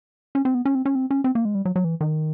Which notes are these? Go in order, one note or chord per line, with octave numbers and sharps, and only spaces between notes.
C#4
C4
B3
C#4
C4
C#4
C4
C#4
C4
A#3
G#3
G3
F#3
F#3
E3
D#3